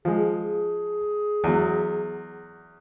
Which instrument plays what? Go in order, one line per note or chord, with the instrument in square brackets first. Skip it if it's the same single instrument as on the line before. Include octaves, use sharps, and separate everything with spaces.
[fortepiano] F3 G#3 [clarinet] G#4
[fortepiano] E2 F#3